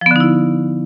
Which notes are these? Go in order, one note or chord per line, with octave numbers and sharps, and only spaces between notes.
D3 F3 B3 D#4 E4